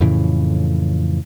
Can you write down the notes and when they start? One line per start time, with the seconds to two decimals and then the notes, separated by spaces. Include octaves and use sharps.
0.01 F2 A2 C#3 E3